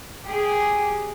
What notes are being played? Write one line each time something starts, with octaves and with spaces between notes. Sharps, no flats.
G4 G#4